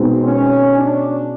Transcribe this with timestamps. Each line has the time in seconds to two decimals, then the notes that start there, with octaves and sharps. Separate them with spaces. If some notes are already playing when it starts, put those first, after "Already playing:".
Already playing: B2 G#3 B3 C4 D#4
0.24 C#4
0.77 D4